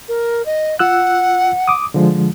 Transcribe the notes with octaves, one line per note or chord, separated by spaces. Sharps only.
A#4
D#5
F4 F#5 E6 F#6
D6 D#6
D3 F3 G#3